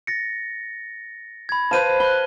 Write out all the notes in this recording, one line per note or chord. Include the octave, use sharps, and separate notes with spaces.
A6 A#6 C#7
B5 G#6
B4 C5 F5 A5 D#7
B5 F#6 G7